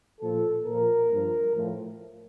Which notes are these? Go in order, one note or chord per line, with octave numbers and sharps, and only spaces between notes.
A#2 F3 A4
A#2 F3 A#4
G2 F3
A2 F3